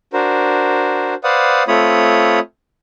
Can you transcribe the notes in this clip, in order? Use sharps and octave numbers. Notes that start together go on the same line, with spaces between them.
D4 F#4 A#4 C5
B4 C5 D5 F5 F#5 D#6
A3 C4 F4 C#5 B5 D#6